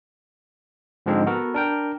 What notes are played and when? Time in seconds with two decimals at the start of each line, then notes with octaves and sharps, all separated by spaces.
1.06 G#2 D3 F3 G#3 C4 D#4
1.26 B3 F#4 A4 A#4
1.54 D4 A#4 G5